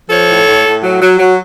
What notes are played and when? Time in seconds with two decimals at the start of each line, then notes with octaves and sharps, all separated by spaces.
0.10 F3 A4 C#5
0.29 A2
0.47 A2
0.64 A2
0.84 F#3
1.02 F#3
1.19 F#3